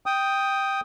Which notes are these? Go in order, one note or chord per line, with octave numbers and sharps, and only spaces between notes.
G5 D#6